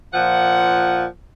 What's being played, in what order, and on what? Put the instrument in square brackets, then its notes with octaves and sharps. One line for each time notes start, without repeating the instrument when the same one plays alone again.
[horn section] A#2 F3 F#5